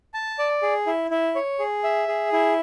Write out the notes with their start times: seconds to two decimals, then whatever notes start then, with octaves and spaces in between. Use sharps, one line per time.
0.14 A5
0.39 D5
0.62 G#4
0.87 E4
1.11 E4
1.35 C#5
1.59 G#4
1.84 E5
2.08 G#4
2.32 E4